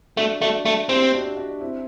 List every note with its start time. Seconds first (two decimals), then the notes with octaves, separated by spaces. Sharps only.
0.17 A3 D4 F#4
0.42 A3 D4 F#4
0.65 A3
0.89 C4 E4 G4
1.13 D4 F#4
1.37 D4 F#4
1.61 C4 E4